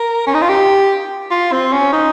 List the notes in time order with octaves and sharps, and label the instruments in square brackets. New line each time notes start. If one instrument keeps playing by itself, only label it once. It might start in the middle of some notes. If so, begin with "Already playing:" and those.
Already playing: [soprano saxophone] A#4
C#4
D#4
F4
G4
F4
C4
C#4
D#4